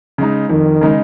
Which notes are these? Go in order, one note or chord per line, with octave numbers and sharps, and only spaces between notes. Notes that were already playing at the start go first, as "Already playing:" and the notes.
C#3 G#3 D#4
F2 D#3
C#3 G#3 D#4